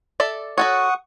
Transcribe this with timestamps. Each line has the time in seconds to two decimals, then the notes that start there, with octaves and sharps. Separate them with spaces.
0.20 A4 D5 E5
0.58 F#4 A4 C#5 F#5 C#6 D#6